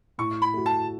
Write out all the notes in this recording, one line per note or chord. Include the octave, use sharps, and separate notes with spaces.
A2 C#6
B5
A3 F#4
A5